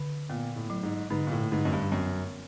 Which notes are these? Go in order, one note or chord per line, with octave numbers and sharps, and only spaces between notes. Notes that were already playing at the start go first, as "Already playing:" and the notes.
Already playing: D3
A#2 B3
A2
F#3
G#2
G#2 D3
A#2
A2
G#2 D3
F#2
G2
F#2 B3